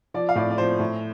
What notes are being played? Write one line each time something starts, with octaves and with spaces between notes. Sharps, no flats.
F3 D5
F5
A2 D5
D5
F3 C5
A2